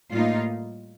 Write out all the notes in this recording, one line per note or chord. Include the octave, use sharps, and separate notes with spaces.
A2 G3 A#3 D#4 F4